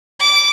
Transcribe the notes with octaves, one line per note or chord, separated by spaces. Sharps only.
D6